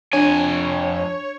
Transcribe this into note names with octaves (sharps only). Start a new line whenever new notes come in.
F2 D4 C#5 G#5